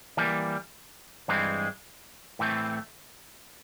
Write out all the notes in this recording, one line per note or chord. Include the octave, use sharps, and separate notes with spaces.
E3 G3 A#3
G2 E3 G#3 C4
A2 E3 A3 C4